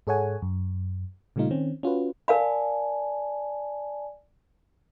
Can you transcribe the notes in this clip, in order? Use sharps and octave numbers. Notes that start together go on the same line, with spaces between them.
G#2 G#4 A4 C#5 F#5 G#5
F#2
A#2 C#3 G3 A3 D#4 F4
D#3 C4 C#4
C#4 F4 F#4 B4
A#4 D5 F5 G#5 A5 B5